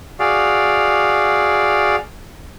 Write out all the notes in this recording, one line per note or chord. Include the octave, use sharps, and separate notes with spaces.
F#4 G#4 D5 F5